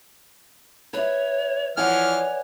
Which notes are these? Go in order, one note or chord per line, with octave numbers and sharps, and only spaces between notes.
B4 C#5 E5
E3 F3 C#5 D5 F#5 G#5 F6